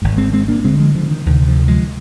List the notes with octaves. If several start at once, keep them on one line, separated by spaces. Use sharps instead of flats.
G#1 G#2
G#3 C4
G#3 C4
A#3 D4
D2 D3 G#3 C4
F3 G#3
D3 F3
D#3
D2 C3 D#3
D3 F3
F3 G#3